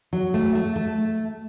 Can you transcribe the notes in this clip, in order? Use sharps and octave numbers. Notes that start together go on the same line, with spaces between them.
F#3
A3
A3
A3